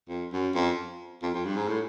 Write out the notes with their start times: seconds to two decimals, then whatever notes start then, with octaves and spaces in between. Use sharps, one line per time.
0.09 F2
0.33 F#2
0.55 F2
1.22 F2
1.34 F2
1.45 G2
1.57 G#2
1.68 A2